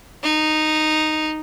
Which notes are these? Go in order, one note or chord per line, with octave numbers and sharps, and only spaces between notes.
D#4